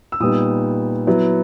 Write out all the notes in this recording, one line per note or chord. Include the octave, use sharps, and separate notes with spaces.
E6
A#2 G3 B3 D#4 D#6
F#3 B3 E4